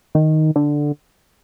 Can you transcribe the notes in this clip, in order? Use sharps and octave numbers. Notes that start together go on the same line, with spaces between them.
D#3
D3